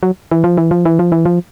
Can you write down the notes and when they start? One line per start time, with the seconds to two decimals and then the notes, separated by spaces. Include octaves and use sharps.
0.03 F#3
0.31 E3
0.44 F3
0.58 E3
0.71 F3
0.85 E3
0.99 F3
1.12 E3
1.26 F3